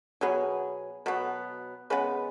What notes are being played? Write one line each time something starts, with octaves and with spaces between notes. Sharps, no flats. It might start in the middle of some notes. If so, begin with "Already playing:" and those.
B2 F#3 B3 G#4
B2 F#3 B3
C#3 G#3 B3 B4